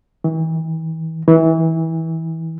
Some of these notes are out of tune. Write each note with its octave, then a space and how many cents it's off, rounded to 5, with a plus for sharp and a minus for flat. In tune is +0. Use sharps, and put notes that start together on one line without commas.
E3 -40
E3 -25